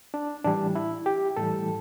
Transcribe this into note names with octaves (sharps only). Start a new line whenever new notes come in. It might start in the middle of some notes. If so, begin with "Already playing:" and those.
D4
A2 E3 G3 D4
E4
G4
A2 E3 G3 A4